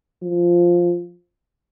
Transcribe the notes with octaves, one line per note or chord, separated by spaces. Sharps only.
F3